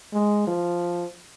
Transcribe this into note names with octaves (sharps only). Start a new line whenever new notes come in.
G#3
F3